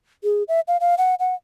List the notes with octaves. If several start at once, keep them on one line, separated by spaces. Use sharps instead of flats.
G#4
E5
F5
F5
F#5
F#5